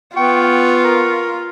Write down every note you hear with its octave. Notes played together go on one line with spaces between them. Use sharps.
B3 F4 G5 C#6
A#4